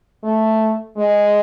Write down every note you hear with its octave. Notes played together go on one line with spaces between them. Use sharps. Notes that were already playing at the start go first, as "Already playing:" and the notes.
A3
G#3